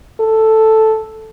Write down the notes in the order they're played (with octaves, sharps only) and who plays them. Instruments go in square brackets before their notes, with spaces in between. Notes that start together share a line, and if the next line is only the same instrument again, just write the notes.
[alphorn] A4